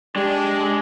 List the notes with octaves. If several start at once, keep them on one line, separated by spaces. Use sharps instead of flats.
G#3 D4 G4